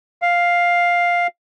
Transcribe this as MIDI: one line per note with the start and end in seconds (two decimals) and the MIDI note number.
0.22 1.27 77